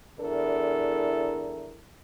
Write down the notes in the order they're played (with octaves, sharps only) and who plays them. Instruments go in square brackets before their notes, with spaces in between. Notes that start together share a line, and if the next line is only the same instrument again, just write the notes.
[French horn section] E2 D4 E4 A4 A#4